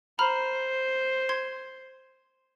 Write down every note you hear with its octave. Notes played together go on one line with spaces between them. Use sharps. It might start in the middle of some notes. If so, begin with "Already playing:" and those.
C5 A#5 B5 F6
C6 G#6